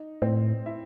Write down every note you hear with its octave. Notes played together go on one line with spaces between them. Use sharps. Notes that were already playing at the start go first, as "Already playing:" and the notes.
Already playing: D#4
A2 C4 C5
E4 E5